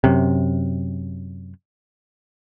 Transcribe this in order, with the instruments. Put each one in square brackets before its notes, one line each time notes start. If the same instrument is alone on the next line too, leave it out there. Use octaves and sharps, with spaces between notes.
[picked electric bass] F#2 C3